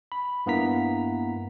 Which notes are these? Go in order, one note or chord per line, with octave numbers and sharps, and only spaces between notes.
B5
G2 A#3 B3 E4 A#5 B6